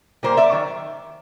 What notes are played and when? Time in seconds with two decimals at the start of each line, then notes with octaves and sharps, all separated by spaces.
0.23 A#2 G3 A#3 A#4 C5
0.37 D5 E5
0.52 D#3 F#3